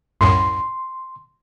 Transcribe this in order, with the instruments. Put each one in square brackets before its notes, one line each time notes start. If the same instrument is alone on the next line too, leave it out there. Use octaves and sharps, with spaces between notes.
[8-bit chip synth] C2 F#2 A2 [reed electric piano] C6